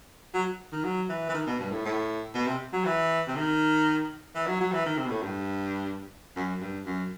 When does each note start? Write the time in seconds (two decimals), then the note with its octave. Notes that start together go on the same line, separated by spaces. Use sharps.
0.34 F#3
0.73 D#3
0.84 F#3
1.09 E3
1.29 E3
1.34 D#3
1.47 B2
1.60 G2
1.72 A2
1.85 A2
2.35 B2
2.47 C3
2.73 F#3
2.85 E3
3.28 C3
3.35 D#3
4.35 E3
4.47 F#3
4.61 F#3
4.72 E3
4.86 D#3
4.97 C3
5.06 B2
5.11 A2
5.23 G2
6.36 F#2
6.61 G2
6.85 F#2